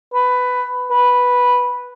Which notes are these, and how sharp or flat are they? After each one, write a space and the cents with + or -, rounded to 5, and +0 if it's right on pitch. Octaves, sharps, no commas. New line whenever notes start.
B4 +10
B4 -5